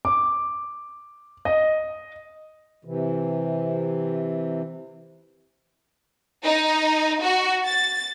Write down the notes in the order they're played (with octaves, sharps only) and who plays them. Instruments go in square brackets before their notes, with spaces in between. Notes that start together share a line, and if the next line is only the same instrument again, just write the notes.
[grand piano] D6
D#5
[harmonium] C3 E3
[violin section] D#4
F#4
A6